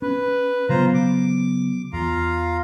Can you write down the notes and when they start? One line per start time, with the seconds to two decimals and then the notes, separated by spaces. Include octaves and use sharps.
0.02 C#4 B4
0.69 C#3 F#3 B3 F4 C5 A#5
0.94 D6
1.93 E2 F4 F5 A#5